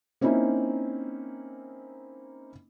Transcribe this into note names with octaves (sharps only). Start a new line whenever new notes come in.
A#3 C4 C#4 D#4 E4